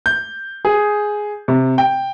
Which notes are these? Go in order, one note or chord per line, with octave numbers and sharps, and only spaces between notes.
G6
G#4
C3
G5